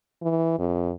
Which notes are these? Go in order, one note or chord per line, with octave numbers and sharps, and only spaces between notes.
E3
F2